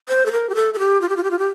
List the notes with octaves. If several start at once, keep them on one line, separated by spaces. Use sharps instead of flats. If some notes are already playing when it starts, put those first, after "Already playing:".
C5
A4
A#4
G4
A4
A4
G4
F4
G4
F4
G4
F4
G4